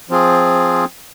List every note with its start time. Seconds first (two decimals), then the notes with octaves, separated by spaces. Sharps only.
0.09 F3 C4 F4 G#4